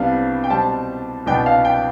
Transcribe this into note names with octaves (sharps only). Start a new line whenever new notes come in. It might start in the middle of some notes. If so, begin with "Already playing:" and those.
Already playing: C2 C3 G3 B3 D4 F5
G5
B2 G3 C4 A5
C2 B2 B3 D4 G5
F5
G5